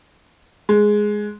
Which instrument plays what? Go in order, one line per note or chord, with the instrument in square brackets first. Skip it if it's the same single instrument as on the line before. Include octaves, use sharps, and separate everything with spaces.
[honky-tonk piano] G#3